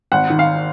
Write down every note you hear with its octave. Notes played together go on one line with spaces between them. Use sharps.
G#1 F#5
D#3
F5